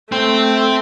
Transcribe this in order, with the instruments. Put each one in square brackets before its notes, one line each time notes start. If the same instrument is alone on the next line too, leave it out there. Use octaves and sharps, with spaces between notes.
[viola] A3 [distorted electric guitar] C4